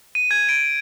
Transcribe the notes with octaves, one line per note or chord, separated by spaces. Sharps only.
D#7
G#6
D7